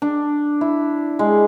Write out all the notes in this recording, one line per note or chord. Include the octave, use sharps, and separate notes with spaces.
D4
E4
G#3